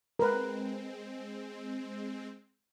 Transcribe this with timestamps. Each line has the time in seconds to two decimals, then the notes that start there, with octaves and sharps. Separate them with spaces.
0.19 G#3 C4 A#4 B4